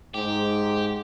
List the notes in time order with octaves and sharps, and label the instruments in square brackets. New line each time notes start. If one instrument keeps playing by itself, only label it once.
[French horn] G#2 [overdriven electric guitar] G4